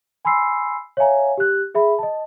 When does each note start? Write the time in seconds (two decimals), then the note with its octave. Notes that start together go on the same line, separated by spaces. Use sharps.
0.25 G#5 B5 C6 E6 C7
0.97 C#5 E5 F5 G#5 A#5
1.38 G4 F#6
1.75 G#4 E5 B5
1.99 D#5 A5